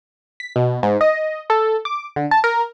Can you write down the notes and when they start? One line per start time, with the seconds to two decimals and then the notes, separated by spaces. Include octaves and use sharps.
0.40 B6
0.56 B2
0.83 G#2
1.01 D#5
1.50 A4
1.85 D6
2.16 D3
2.31 A5
2.44 A#4